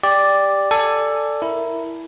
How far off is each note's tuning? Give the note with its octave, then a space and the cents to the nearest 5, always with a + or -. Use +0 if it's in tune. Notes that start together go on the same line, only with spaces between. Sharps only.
G4 +15 D5 +0
A4 +15 D5 +0 G#5 +0
E4 +0 A#4 +0